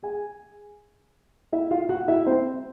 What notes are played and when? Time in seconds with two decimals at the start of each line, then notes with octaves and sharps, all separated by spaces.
0.03 G#4 G#5
1.52 E4 E5
1.71 F4 F5
1.89 F#4 F#5
2.08 E4 E5
2.26 C4 C5